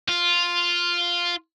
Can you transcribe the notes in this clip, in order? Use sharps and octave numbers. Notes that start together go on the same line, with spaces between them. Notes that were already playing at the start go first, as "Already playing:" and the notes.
F4